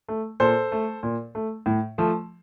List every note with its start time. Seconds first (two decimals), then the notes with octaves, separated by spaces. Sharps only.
0.08 A3
0.40 A#2 A4 C5
0.72 A3
1.03 A#2
1.35 A3
1.66 A2
1.98 F3 A3